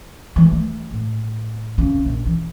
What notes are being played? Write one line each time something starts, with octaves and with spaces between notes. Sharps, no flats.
E3 G3
A3
A2
C2 C#3
A#1
E3